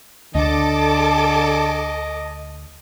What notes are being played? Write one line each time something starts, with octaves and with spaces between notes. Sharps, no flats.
D2 D3 A4 D#5 A5 D6